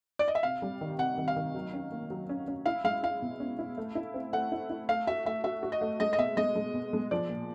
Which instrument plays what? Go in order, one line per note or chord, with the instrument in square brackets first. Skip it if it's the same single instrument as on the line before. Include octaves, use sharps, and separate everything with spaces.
[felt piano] D5
D#5
E5
[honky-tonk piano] C3 [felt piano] F5
[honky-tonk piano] G3
D#3
[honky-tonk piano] C3 [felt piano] F#5
[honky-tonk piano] D#3
[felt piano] F5
[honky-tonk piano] D#3
F#3
C#4
A#3
F#3
C#4
C#4
[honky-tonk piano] E4 [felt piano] F5
[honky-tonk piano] G#3 [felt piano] F5
[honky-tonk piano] E4 [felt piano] F5
[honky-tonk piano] B2
C#4
E4
A3
E4
C4
[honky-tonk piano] A3 [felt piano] F#5
[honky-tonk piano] E4
E4
[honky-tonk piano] A3 [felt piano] F5
[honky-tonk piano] F#4 [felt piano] E5
[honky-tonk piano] A3 [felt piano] E5
[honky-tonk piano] F#4 [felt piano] E5
[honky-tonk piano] F#4
[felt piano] D#5
[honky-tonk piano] A3
[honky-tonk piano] G#3 [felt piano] D#5
[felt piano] D#5
[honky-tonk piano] B2 [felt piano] E5
[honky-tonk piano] G#3 [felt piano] D#5
[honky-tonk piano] G#3
B2
G#3
[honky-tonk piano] F3 [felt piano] D5
[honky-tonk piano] A#2